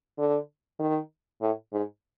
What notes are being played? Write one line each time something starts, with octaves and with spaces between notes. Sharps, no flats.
D3
D#3
A2
G#2